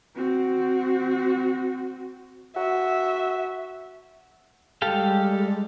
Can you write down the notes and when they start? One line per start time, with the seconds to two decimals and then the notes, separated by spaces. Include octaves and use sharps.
0.16 C4 F#4
2.56 F#4 E5
4.82 G3 G#3 G4 A4 F5